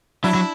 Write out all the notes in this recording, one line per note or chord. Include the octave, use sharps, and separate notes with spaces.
F#3 D4 E4
F#3